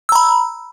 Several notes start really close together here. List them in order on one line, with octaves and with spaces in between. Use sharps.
E6 A#5 B5